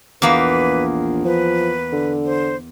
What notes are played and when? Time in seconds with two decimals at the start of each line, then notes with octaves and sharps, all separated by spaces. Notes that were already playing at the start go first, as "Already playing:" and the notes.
0.22 A#1 E2 A#3 B4
1.25 F3 B4
1.93 D3
2.25 C5